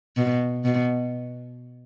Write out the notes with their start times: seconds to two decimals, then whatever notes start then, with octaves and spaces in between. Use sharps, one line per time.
0.17 B2
0.65 B2